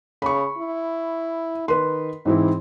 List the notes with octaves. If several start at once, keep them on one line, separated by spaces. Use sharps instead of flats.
C#3 B5 C#6
E4
D#3 B4 C6
G#2 E3 C4 E4